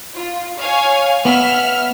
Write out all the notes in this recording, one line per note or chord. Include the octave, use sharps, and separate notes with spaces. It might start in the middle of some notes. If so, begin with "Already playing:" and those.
F4
C#5 F5 G#5
B3 E5 F6